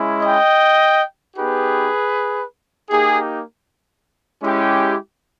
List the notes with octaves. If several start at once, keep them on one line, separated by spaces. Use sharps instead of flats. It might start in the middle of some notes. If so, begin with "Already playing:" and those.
Already playing: G#3 C#4 E4
D#5 G5
B3 D#4 G4 G#4 B4
A#3 D#4 G4 G#4
G#3 C#4 E4 G4